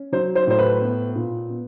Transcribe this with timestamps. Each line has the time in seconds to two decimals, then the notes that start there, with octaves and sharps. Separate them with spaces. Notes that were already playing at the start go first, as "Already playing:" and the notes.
Already playing: C#4
0.12 F#3 C5
0.35 C5
0.47 A2 C5
0.59 B4
0.81 B3
1.15 A#2
1.50 B3